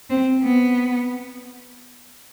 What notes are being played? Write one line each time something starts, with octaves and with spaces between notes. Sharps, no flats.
C4
B3